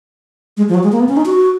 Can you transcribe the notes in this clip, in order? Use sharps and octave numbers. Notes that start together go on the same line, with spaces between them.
G#3
F3
F#3
G#3
A#3
B3
C#4
D#4
F#4